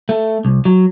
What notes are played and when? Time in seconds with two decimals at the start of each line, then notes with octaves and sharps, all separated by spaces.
0.09 A3
0.45 C2
0.65 F#3